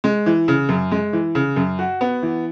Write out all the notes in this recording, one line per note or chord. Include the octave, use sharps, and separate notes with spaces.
G#3
E3
C#3
F#2
G#3
E3
C#3
F#2
F#4
B3
E3